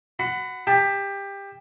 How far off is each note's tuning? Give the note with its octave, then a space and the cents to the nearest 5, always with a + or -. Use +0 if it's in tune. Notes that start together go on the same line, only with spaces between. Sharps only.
F#4 +0 B5 +30
G4 +20 A5 +0